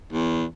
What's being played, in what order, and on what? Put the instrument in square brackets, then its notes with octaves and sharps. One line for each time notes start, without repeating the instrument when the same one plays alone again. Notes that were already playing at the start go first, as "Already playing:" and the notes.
[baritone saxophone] E2